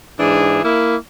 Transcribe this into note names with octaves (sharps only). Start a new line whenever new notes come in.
G#2 E3 D4 G#4
A#3 E4